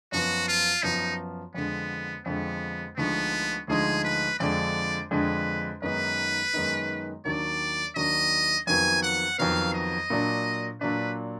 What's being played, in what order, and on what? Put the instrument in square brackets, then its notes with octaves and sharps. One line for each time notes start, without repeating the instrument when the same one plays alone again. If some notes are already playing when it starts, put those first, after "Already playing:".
[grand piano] F#2 F3 B3 [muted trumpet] F#4
[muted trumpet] F4
[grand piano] F#2 F3 B3 [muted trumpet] D#4
[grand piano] F2 D3 G#3 [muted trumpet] B3
[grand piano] F2 D3 G#3 [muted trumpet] B3
[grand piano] D2 D3 F3 G#3 D#4 [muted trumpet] B3
[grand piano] D2 D3 F3 G#3 D#4 [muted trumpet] G#4
[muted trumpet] B4
[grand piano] F2 D3 G#3 D4 [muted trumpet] D5
[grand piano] F2 D3 G#3 D4 [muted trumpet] B4
[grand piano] F#2 D#3 G#3 B3 D#4 [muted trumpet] B4
[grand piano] F#2 D#3 G#3 B3 D#4
[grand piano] D#2 D#3 F#3 D4 [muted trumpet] D5
[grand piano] D#2 D#3 F#3 D4 [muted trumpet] D#5
[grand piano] F2 D#3 F#3 B3 [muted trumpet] G#5
[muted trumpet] F#5
[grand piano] F2 D#3 F#3 B3 [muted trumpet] F5
[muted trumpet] D#5
[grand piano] A#2 F#3 D4
[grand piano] A#2 F#3 D4 [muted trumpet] B4